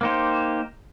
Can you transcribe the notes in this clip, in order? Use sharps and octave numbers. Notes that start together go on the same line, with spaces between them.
A#3 D#4 G4 C5